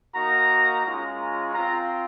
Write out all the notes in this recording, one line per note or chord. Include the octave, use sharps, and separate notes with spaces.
A#3 D#4 F#4 A#5
G#3 C#4 F4
A#5
C4 F4 A#5